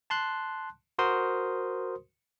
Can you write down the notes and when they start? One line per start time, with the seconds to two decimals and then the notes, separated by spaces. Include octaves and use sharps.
0.10 A5 C6 F#6
0.99 F#4 A#4 C5 C6 D#6